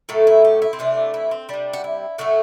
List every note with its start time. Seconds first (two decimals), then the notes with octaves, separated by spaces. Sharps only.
0.09 A2 F#3 A3 A4
0.27 E4
0.45 G4
0.62 E4
0.73 C4
0.79 C3 E3 A3 D4
1.14 E4
1.31 C4
1.49 C3 G3 D4
1.73 F#4
1.84 E4
2.18 A2 F#3 A3 F#4